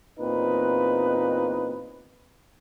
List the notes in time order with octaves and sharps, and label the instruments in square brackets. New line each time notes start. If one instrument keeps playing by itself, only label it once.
[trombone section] E2 A#2 C4 D#4 B4